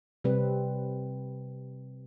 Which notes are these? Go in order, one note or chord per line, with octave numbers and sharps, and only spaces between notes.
C3 G3 C4 B4